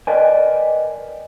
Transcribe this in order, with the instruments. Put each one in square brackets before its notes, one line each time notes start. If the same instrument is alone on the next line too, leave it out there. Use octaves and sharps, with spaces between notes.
[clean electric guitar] A#4 B4 D5 D#5 G5 G#5